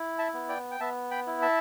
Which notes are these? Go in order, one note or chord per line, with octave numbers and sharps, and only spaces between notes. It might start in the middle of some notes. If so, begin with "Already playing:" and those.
Already playing: E4
E5 A5
B3
D5 G5
G5
B3 E5 A5
G5 B5
E4
E5 A5